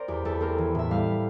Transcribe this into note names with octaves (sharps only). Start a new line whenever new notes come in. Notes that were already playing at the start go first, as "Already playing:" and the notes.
Already playing: C4 A#4 C5 D5
E2 G4
E2 A4
C4 A#4
E3
A2 E5
G3 F5